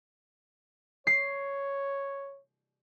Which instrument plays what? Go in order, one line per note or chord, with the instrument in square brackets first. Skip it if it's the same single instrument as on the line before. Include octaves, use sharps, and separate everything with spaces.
[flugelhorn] C#5 [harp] C7